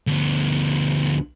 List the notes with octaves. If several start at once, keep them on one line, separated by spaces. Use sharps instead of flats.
D2 B3